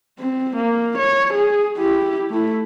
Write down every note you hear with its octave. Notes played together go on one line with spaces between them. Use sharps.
C4
A#3
C#5
G#4
E4 G4
A3 E4